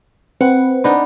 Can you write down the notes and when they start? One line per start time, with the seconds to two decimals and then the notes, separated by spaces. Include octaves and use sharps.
0.41 C4 B4 F#5
0.84 B3 D4 D#4